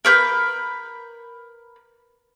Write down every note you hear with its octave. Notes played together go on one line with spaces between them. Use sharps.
A#4 B4 G6